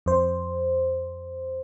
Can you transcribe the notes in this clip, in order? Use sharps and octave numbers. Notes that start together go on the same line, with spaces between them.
F2 C5